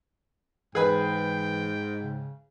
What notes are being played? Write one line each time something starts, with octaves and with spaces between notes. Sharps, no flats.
G#2 E3 G#4 B4 G5
C#3